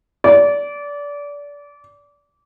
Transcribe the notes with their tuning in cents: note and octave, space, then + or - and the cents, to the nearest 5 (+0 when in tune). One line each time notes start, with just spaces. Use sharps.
D5 -25